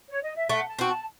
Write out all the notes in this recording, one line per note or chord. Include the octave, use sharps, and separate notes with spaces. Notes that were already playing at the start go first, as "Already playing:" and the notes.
C#5
D#5
E5
A3 F#5
A5
C4 F#4
A5